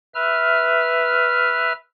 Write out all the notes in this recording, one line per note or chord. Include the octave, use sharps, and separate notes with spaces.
B4 E5 F6